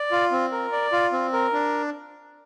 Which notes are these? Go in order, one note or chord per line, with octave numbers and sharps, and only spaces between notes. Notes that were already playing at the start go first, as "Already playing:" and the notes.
Already playing: D5
F4
C4
A#4
D5
F4
C4
A#4
D4